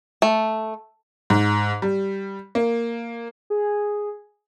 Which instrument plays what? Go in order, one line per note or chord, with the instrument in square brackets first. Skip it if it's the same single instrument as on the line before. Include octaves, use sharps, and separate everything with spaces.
[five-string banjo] A3
[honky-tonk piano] G#2
G3
A#3
[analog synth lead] G#4